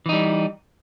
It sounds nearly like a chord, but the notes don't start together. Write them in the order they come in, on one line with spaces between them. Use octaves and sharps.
E3 D#4 G3